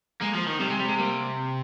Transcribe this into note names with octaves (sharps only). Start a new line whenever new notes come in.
G#3 A#3
F3
D#3
C3 G3
G#3
G3
G#3
G3 A#3